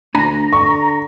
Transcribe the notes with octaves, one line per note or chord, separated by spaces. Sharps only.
D2 D4 G#5 A#5 B5
D3 C#6